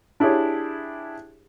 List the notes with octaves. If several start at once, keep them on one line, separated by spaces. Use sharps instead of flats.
D4 E4 G4 G#4 C#5